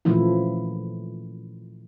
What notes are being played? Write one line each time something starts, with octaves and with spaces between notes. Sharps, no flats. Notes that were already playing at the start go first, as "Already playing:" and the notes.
A#2 C#3 E3 F3 A3 E4